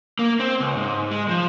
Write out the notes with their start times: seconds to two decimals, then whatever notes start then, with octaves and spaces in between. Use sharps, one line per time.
0.19 A#3
0.40 C4
0.60 C#2
0.77 G#2
1.11 G#3
1.29 F3